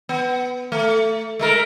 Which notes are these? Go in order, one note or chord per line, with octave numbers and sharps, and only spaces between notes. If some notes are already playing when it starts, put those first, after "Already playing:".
B3
A3
G#3 A3 A#4